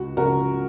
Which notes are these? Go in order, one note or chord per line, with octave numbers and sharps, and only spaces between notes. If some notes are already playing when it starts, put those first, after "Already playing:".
Already playing: C#2 F#4
C#3 F#4 A#4